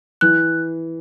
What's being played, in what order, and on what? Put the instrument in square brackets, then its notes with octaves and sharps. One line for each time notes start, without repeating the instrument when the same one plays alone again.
[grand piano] E3 [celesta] F#6